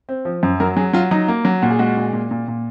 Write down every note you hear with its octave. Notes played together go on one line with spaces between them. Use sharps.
C4
F3
F#2
F#3 A#4
F#3 G#4
F#3 F4
F#3 D#4
A#3
F#3
A#2 F#4
G#4
G#3 F#4
A#2
A#2
A#2
A#2